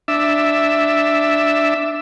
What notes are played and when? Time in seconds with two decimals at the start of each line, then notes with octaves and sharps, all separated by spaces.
0.08 D4 E5